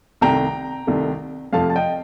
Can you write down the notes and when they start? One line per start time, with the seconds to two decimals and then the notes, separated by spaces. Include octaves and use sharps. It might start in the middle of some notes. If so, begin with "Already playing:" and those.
0.21 C2 C3 D#3 A3 G5 A#5
0.87 C2 C3 D#3 A3
1.53 F2 C3 F3 A3 F5 A5
1.70 A5
1.75 D#5 G5